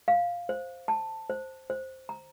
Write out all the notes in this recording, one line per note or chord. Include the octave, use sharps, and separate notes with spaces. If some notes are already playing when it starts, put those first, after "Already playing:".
F5
C5
A5
C5
C5
A#5